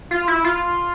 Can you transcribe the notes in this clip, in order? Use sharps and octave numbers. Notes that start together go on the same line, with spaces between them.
F4
E4
F4